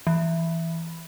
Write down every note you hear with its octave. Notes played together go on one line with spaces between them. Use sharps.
E3